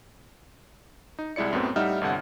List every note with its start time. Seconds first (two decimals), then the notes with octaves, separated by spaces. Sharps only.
1.19 D#4
1.36 C2 G#3 E4 D5 C#7
1.53 F#2 A2 B3 C4
1.76 A2 G3 D#4 E5 F#5 F6
2.01 G1 C2 D3 F#5